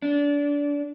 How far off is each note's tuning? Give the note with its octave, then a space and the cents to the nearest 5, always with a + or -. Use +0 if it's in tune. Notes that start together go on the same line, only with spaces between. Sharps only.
D4 -25